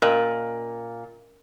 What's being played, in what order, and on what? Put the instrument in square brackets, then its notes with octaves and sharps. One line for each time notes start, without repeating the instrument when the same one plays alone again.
[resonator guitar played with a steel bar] A#2 [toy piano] C#4 A#4 D#5